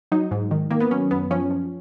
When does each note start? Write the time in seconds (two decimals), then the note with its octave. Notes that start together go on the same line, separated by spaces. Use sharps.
0.12 F#3 D#4
0.31 G#2
0.51 D#3
0.71 D#3 A#3
0.80 B3
0.91 F#3 C#4
1.11 F#2 B3
1.31 F3 C#4
1.51 F3